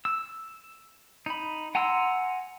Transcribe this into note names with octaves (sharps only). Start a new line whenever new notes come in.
E6
D#4 B5
F#5 G#5 A#5 C6 E6